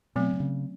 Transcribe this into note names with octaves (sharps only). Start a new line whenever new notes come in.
B2 F#3 A3 C4
C3
C#3